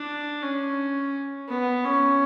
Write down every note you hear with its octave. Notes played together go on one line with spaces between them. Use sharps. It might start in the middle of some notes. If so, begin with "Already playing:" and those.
Already playing: D4
C#4
B3
C#4